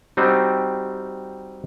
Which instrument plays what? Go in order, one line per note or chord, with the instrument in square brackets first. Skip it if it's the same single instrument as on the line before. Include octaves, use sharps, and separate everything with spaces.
[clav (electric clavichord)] G3 C4 D#4 F#4 G4